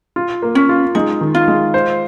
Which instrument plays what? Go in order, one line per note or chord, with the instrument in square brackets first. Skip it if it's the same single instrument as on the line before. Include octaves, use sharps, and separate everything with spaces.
[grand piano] F4
A#3
[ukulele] C#4
[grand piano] F4
[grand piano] G#3 [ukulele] D#4
[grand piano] D#3
[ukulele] F4
[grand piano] G#3
C5